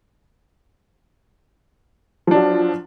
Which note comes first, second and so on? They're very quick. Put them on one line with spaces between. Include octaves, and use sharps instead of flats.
F3 D4 F#3